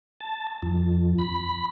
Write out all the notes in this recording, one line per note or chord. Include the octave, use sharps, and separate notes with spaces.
A5
F2
B5